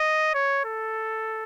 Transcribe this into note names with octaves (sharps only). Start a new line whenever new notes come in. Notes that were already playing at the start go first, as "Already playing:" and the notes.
Already playing: D#5
C#5
A4